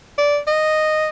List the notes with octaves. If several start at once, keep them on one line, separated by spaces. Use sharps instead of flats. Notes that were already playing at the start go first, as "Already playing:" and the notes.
D5
D#5